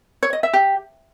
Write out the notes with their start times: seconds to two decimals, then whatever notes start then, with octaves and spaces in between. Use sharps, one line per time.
0.23 C#5
0.33 D#5
0.43 E5
0.53 G4